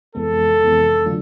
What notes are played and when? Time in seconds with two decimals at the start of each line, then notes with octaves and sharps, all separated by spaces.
0.15 F2 C3 E3 G#3 B3 A4
0.60 F2 C3 E3 G#3 B3
1.06 D3 F#3 A3 D4 F4